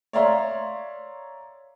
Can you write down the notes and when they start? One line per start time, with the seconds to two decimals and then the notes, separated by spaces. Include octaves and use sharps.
0.13 C#5 D5 E5 F5 A#5 C6